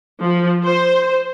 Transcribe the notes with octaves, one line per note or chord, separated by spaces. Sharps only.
F3
C5